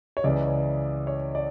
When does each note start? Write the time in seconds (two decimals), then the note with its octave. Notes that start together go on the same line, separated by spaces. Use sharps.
0.17 C#5
0.24 C#2 C#3 E3 D5
1.07 C#5
1.35 D5